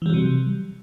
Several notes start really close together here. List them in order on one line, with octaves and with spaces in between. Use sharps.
E3 G3 F#3 C3